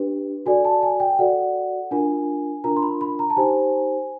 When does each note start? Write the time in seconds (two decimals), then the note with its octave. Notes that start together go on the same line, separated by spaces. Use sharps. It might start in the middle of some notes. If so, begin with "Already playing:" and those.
Already playing: D4 G4 B4
0.46 F#4 A4 D5 G#5
0.65 A5
0.83 G#5
1.00 G5
1.19 F#4 A4 D5 F#5
1.91 D4 F4 A#4 G#5
2.64 D4 F4 A#4 A#5
2.76 C6
2.82 B5
3.01 B5
3.19 A#5
3.30 A5
3.37 D#4 G4 C5 G#5